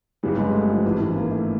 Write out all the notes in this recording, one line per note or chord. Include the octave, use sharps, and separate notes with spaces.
G1 F#2 C#3 F#3 G3 B3
G#3
A3
F3
G#1 F#2 D#3 E3
E3
A#3
A3